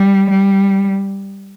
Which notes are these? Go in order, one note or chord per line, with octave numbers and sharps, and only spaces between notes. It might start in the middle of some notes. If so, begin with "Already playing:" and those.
Already playing: G3
G3